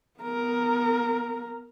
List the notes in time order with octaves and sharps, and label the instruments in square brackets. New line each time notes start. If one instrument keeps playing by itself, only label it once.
[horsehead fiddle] B3 A#4